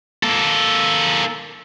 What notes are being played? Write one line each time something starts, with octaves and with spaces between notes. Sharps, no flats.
A#3 A4